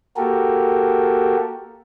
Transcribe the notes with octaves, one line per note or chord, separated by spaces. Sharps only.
A#3 F#4 G4 A4 A#4